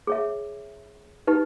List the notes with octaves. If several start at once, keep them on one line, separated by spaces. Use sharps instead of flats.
G#4 C#5 E5
D#4 G4 B4